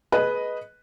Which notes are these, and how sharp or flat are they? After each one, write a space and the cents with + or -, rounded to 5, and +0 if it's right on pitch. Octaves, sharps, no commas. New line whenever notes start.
G#4 +25 B4 +0 D#5 +0